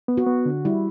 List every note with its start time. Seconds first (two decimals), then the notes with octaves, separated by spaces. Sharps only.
0.08 B3
0.17 F#4
0.26 B3
0.45 D3
0.65 G3 E4